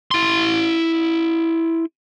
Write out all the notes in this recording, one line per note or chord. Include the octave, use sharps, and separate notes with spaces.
E4 C6